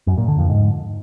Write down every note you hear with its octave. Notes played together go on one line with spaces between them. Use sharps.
F#2
A#2
D3
F2
G#2